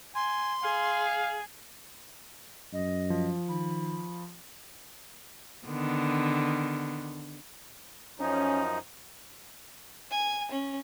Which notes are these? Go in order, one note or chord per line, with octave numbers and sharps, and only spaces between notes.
G#5 C6
G#4 F5
F#2 D#5
F3
D#3 B5
D3 D#3 B3
F#2 F3 C#4 D#4
G#5
C#4